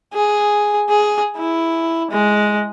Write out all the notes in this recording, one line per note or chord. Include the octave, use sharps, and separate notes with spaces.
G#4
G#4
E4
G#3